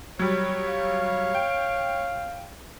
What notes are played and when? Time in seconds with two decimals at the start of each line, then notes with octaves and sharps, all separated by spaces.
0.19 F#3 G3 C#5
0.67 F5
1.35 G5